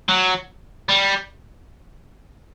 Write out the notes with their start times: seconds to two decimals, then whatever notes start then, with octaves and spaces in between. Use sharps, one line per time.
0.09 F#3
0.89 G3